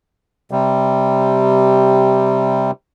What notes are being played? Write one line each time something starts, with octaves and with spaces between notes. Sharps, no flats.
C3 G3